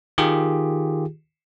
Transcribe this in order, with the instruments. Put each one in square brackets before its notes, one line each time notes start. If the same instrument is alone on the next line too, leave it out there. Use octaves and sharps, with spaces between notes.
[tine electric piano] D#3 F4 G4 G#4